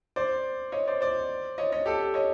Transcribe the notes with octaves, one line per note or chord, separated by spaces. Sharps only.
C5 D5
C#5 D#5
C5 D5
C5 D5
C#5 D#5
C#5 D#5
G4 A4
C#5 D#5